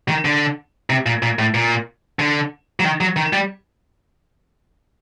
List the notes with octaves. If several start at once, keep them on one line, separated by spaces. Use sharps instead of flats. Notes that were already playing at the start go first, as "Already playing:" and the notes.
D#3
D3
C3
A#2
A#2
A2
A#2
D3
F#3
D#3
F#3
D#3
G3